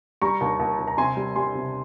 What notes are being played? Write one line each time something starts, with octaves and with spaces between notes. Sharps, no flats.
G3 A#5 C#6
D#2
D#2
D#2
A#5
C3 G#5 C6
G3
G3 G#5 C6
C3